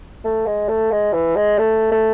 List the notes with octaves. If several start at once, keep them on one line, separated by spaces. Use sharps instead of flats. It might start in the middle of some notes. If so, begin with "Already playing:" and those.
A3
G#3
A3
G#3
E3
G#3
A3
A3